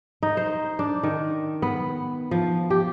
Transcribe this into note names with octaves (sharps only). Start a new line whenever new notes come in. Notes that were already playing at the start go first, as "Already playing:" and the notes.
D#4
C5
D4
D#3
B3
F3
G4